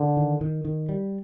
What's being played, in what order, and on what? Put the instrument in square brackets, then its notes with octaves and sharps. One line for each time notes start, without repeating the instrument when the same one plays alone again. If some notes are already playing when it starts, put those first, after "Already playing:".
Already playing: [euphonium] D3
[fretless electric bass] D#3
D#3
D#3
G3